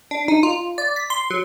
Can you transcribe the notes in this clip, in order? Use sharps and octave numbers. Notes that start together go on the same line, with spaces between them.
D4
D#4
F4
D5
B6
C6
F#3